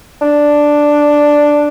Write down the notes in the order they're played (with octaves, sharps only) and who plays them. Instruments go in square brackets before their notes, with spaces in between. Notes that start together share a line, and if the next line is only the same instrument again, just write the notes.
[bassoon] D4